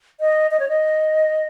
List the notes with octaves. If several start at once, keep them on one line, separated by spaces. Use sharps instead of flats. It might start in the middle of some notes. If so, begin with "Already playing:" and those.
D#5
D#5
C#5
D#5